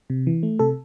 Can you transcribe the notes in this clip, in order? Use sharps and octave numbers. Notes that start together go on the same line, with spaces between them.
C3
E3
A3
C3 A4